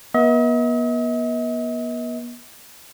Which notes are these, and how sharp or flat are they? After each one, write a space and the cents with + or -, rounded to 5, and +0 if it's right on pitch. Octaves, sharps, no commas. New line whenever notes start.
B3 -40 D#5 +45